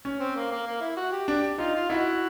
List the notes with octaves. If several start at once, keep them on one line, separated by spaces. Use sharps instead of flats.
C#4
C4
A#3
A#3
A#3
E4
F#4
G4
D4 G4
D#4 F4
F4
D#4 E4 F#4